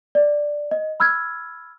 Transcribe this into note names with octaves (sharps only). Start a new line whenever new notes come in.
D5
D#5
B5 E6 F6 G#6